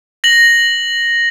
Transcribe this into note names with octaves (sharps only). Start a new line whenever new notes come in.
A#6 F#7